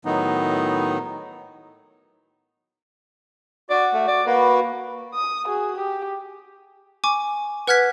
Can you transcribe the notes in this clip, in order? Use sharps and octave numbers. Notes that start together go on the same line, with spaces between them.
A2 D#3 F#3 B3 D#4
F#4 D5
A3
D5
A#3 F#4 B4
D#6
F#4 G#4
G4
G#5 C#6 D6
B4 F#5 F6 F#6 G#6 B6